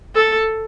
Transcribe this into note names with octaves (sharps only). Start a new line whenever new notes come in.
A4